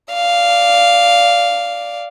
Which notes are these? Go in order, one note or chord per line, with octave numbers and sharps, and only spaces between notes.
D5 F5